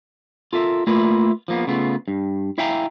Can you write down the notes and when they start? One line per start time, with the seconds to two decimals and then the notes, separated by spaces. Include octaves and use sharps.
0.53 F4 A4 A#4 E5
0.87 A3 A#3 E4 F4 A#4 B4
1.48 F3 A#3 B3
1.67 C#3 A3 B3 F4
2.08 G2
2.58 E4 E5 F5 G5 G#5 A#5